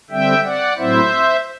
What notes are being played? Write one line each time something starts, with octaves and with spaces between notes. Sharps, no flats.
D3 G3 C4 E5 G5
D5 F#5
A2 F#3 C4 E4 C5 E5